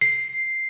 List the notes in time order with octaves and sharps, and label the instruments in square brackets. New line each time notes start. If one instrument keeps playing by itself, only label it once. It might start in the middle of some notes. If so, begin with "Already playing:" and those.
[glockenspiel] C7